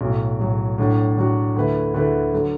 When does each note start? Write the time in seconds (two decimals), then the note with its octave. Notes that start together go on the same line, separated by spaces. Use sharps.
0.01 B1 A2 F#3
0.40 B1 A2 F#3
0.78 A2 F#3 D4 F#4
1.17 A2 F#3 D4 F#4
1.56 D2 D3 A3 E4 B4
1.94 D2 D3 A3 E4 B4
2.33 D3 F#3